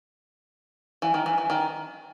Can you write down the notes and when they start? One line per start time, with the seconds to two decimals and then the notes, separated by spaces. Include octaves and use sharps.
1.02 E3
1.14 D#3
1.26 E3
1.38 E3
1.50 D#3